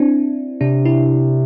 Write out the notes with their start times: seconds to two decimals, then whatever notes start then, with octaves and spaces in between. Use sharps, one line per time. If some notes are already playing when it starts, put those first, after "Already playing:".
Already playing: C4 D4 E4
0.61 C3 D4
0.85 E4